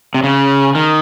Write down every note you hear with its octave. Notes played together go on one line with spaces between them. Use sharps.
C3
C#3
D#3